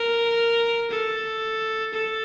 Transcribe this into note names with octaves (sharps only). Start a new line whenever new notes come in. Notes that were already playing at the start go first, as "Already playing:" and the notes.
Already playing: A#4
A4
A4